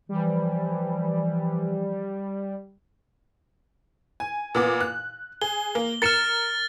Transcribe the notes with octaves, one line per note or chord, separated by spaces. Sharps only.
E3 F3 G3
G#5
A#2 B3 D6
F#6
G#4 G7
A#3
A#4 F6 A6 C#7 E7